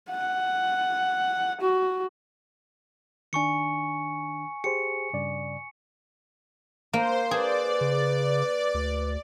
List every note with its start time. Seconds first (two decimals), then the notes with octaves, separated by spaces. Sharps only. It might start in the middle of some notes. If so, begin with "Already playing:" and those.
0.10 F#5
1.61 F#4
3.33 D#3 D4 G#5 C#6 C#7
4.64 G4 G#4 C5 C#7
5.13 G2 C#3 D5
6.93 A#3 C5
7.31 G#4 B4 D5
7.81 C#3
8.74 D2